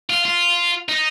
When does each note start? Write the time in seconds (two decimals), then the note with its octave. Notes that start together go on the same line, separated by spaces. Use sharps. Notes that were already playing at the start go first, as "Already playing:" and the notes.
0.10 F4
0.25 F4
0.89 D#4